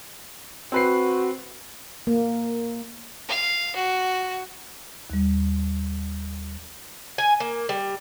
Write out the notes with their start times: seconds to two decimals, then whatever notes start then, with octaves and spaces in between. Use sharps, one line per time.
0.72 C4 F#4 B4 C7
2.07 A#3
3.28 F5
3.76 F#4
5.10 D#2 G3
7.18 G#5
7.40 A#3
7.69 G3